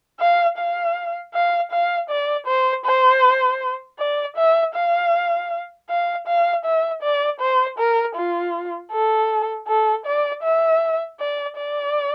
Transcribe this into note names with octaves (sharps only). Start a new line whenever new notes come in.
F5
F5
F5
F5
D5
C5
C5
D5
E5
F5
F5
F5
E5
D5
C5
A#4
F4
A4
A4
D5
E5
D5
D5